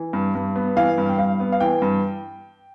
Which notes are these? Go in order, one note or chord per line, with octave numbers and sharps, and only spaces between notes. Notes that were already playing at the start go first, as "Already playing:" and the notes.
Already playing: E3
G2
G2
B3
E3 F5
G2
G5
G2 F5
B3
F5
E3 G5
G2